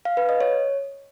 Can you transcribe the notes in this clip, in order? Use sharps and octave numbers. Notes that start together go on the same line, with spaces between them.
F5
B4
D#5
C#5